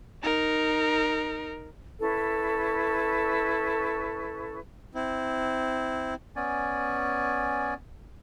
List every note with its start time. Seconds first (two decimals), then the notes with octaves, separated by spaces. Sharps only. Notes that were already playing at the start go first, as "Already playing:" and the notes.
0.23 D#4 A#4
2.00 C#4 E4 A4 B4
4.95 C4 E4
6.36 B3 C#4 D5 G#5